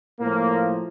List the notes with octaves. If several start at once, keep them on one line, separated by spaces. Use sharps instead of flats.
A2 F3 A#3